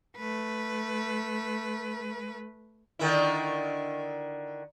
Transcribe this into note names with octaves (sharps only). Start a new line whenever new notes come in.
A3 B4
D3 D#3 E4